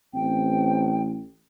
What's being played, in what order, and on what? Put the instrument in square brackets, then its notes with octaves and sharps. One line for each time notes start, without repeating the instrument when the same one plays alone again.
[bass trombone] A1 [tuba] C4 [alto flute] G5